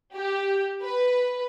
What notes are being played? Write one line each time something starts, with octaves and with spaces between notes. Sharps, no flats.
G4
B4